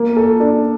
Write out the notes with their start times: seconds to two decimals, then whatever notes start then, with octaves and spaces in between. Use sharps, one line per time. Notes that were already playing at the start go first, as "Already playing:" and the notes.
Already playing: A#3
0.17 A4
0.40 D4